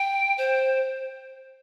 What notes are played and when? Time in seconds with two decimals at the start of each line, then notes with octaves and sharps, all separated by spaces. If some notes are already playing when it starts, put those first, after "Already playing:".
Already playing: G5
0.38 C5